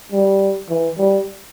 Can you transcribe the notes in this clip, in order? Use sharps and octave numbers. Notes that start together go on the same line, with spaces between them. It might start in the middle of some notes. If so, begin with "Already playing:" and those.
G3
E3
G3